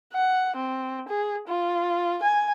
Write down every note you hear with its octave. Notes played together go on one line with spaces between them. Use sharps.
F#5
C4
G#4
F4
G#5